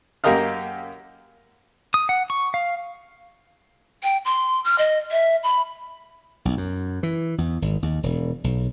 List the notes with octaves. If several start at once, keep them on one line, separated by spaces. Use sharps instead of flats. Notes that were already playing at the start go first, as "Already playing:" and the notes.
F#2 A#3 G4 A#4 D#5 F5
D#6
F#5
C#6
F5
G5
C6
F6
D#5
E5
B5
B1
F#2
E3
E2
G#1
D#2
E1
B1